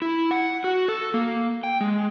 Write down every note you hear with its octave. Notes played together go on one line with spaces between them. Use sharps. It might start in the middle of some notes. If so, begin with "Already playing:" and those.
E4
F#5
F#4
A4
A#3
G5
G#3